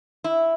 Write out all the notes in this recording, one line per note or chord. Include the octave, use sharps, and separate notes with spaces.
E4